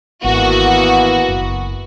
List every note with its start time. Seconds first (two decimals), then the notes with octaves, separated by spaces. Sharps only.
0.24 G#1 E3 A#3 B3 F#4
1.28 F#1